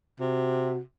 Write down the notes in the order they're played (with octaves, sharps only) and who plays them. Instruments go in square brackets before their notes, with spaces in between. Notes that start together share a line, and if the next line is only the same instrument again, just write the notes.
[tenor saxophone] C3 [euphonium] F#4